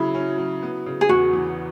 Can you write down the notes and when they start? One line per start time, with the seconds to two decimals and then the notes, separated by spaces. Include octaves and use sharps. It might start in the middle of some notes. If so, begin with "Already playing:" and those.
Already playing: C#3 F#3 E4
0.14 C#4
0.38 F#3
0.62 B3
0.86 C#3
1.01 G#4
1.09 E2 F#4
1.33 E3